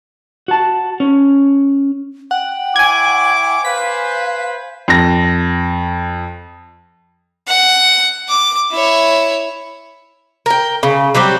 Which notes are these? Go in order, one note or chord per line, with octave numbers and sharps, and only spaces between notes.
F#4 A5
C#4
F#5 G5
E4 C#5 G#5 D6 G#6
B4 C5 F5 B6
F2 A#6
F#5
D6
E4 C#5
A#4 G5
C#3
F#3 G3 C4 G4